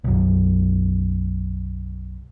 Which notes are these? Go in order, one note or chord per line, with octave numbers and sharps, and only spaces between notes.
B1 F#2